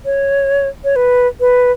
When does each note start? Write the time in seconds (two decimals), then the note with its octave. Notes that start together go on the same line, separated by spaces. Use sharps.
0.05 C#5
0.84 C#5
0.96 B4
1.40 B4